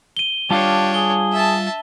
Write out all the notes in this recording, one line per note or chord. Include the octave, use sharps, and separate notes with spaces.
D#7 G7
G3 D4 F4 G4 C#5 F5 A5
G#4 G7
E5 A5